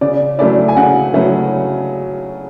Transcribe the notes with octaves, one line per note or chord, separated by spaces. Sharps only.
C#3 D5
F#3 A3 C#4 E4 D5
G#5
C#3 F#5
F#3 A3 C#4 E4